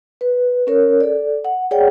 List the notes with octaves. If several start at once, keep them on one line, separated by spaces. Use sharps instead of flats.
B4
C#4 A#4 C#5
A4 D5
F#5
G#4 C#5 D5 F#5 G5